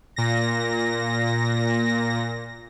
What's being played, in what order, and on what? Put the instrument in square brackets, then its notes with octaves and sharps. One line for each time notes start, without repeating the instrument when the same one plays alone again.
[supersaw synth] A#2 A#6